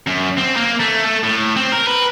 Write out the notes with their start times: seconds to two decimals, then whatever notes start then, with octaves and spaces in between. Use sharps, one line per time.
0.07 F#2
0.37 C4
0.56 A#3
0.80 A3
1.05 A3
1.23 A2
1.56 C4
1.72 A#4
1.87 B4